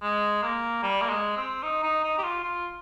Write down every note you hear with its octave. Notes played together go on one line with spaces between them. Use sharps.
G#3
A#3
G3
A#3
G#3
C4
D#4
D#4
D#4
G4
F4
F4